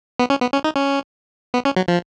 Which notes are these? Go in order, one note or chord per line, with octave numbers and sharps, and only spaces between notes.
B3
C#4
B3
C#4
D#4
C#4
B3
C#4
F#3
F3